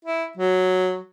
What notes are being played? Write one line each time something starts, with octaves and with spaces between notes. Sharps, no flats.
E4
F#3